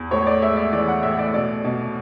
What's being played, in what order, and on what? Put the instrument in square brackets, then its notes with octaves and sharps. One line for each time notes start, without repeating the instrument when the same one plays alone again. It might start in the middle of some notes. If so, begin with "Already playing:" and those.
Already playing: [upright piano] E2
A2 C#5
D5
G#3 E5
D5
E3 D5
F#5
A2 E5
D5
B2 D5
B2